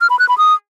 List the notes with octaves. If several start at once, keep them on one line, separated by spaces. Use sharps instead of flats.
F6
B5
F#6
B5
D#6